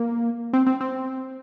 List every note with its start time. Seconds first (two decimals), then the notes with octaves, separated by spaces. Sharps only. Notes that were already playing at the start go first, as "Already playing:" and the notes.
Already playing: A#3
0.53 C4
0.67 C4
0.81 C4